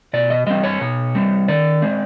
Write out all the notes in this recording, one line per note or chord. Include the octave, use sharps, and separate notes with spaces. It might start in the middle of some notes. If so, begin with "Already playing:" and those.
B2 D5
D#5
G3 C4 D#5
C#5
B2
G3 C4
D#3 D5
G#3 C4